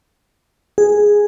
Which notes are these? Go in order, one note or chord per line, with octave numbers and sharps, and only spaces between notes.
G#4